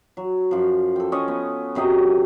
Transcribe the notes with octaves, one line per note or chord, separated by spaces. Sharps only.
F#3
F#2 F3
A4 G5
C#4 D#5 C#6
B3
F#2 C3 F#3 D#5